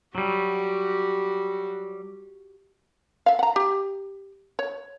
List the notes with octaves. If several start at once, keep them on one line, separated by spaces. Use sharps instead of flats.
F#3 G3 F#4 G4
E5 F5
F#5 A#5
G4
C#5